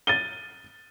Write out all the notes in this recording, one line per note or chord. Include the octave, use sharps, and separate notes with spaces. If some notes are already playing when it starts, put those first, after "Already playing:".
A6 D#7 G7